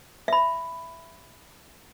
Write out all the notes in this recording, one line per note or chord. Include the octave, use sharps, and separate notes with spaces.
E5 B5